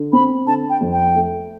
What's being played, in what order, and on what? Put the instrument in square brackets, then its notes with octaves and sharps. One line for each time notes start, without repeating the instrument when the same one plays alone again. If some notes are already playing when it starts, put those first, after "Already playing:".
Already playing: [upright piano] D3
[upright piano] C4 [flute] B5
[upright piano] D3 [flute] A5
[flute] G5
[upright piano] F2
[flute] G5
[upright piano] A3